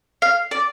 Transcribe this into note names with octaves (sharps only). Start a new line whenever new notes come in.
F5
D5